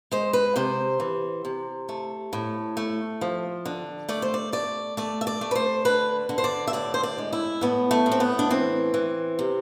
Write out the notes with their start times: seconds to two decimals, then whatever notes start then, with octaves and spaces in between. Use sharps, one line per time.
0.11 G#3 C5
0.33 B4
0.56 C3 C5
1.00 E3
1.45 C3
1.89 A3
2.33 A2
2.77 A3
3.21 F3
3.65 D3
4.09 A3 D5
4.22 C5
4.34 D5
4.53 A3 D5
4.97 A3 D5
5.21 E5
5.27 D5
5.41 A3
5.51 B4
5.55 C5
5.85 D3 B4
6.29 D3
6.38 C5
6.44 D5
6.67 E5
6.73 A2 D5
6.94 C5
7.03 D5
7.18 G#3
7.33 E4
7.61 A2 B3
7.91 A3
8.06 A2
8.12 C4
8.20 B3
8.39 D4
8.50 E3 C4
8.94 E3
9.39 C3